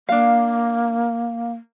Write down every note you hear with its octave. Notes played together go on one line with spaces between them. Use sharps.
A#3 D4 F5